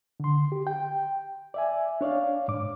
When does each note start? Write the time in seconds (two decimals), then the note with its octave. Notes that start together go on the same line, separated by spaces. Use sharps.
0.20 D3 C6
0.52 G4
0.67 G5
1.54 D5 E5 G#5
2.01 D4 C#5 D5 F5
2.48 G#2 D6